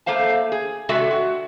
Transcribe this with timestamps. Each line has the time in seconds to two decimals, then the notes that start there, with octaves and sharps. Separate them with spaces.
0.06 A3 A#3 C5 F5 A5
0.52 G#4
0.89 C3 G#3 F#4 A4 D5 E5
1.11 F#4